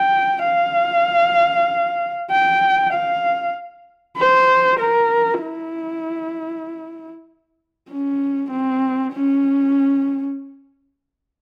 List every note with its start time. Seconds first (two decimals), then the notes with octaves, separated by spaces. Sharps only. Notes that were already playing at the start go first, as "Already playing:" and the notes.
Already playing: G5
0.45 F5
2.31 G5
2.93 F5
4.18 C5
4.80 A#4
5.42 E4
7.90 C#4
8.51 C4
9.13 C#4